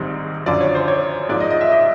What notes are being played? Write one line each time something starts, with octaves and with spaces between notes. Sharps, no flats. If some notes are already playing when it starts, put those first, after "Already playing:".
Already playing: A#1 G#2 D#3 G3 C4
F#2 D3 F3 D5
C#5
C5
C#5
G#2 F3 A#3 D5
D#5
D#5
E5
D#5